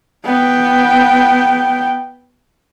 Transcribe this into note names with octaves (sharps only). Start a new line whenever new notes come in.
B3 G5